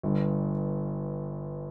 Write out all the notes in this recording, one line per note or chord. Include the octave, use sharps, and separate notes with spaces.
G1 G2